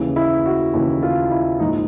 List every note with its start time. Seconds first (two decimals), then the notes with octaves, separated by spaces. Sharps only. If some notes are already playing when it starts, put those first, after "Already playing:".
Already playing: D#2 C#3 E3
0.16 E4
0.46 F#4
0.73 D#2 C#3 E3
1.03 F4
1.31 E4
1.60 A#1 G#2 F3 D#4